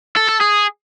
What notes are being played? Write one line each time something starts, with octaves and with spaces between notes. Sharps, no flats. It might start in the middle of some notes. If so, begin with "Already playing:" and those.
A4
A4
G#4